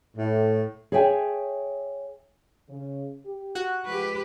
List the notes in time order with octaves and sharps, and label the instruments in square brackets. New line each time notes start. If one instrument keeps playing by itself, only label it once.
[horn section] A2
[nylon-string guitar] G#4 C#5 E5 G5 G#5
[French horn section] C#3
G4
[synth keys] F#4 F#6
[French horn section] F3 G#3 [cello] G4 B4